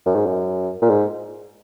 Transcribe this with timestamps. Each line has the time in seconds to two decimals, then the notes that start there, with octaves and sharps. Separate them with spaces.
0.06 F#2
0.15 G#2
0.26 F#2
0.82 A#2
0.90 G#2